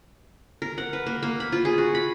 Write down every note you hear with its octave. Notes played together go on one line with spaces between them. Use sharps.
A#4
F#5
B4
A#3
A#3
B5
F4
G#4
F#4
B5